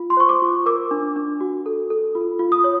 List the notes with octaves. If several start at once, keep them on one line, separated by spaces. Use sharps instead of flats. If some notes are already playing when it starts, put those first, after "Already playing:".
Already playing: F4
C6
C5 C#6
D6
F4
A#4 D6
D4
D4
F#4
A4
A4
F4
F4
D#6
C#5